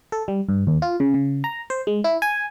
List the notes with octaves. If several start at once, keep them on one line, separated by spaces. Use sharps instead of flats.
A4
G3
G2
D#2
F4
C#3
C#3
A#5
C5
G#3
E4
G#5